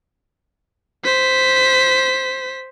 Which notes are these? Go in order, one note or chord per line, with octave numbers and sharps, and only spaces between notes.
C5 B6